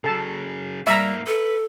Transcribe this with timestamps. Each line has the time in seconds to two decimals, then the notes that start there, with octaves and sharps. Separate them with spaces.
0.04 C#3 F#3 A4 A5
0.87 G#2 G3 A#3 E5 A#5
1.27 A4 B4